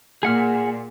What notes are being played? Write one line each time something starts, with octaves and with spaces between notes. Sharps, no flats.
A#2 G#4 F#5 F6